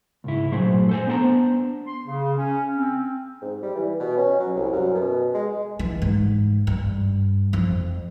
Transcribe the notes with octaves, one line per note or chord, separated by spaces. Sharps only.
C#2 G#2 E4
G2 A#2 F#3 A3 G#4 C5
A4 C5 G#5
B3 D4 C5 G5 A5 A#5
C6
C#3
C#4
C4
G#2
G3
E3
B2
C#4
F#3
C2
F#2
B2
G#3
E3
G#2
G2
F2